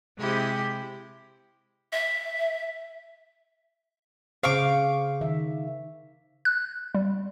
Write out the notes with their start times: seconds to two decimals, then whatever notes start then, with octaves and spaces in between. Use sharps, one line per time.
0.18 C3 G#3 E4 G4
1.92 E5
4.43 C#3 C5 F5 C#6 D6
5.21 D#3 E5
6.45 F#6
6.95 G3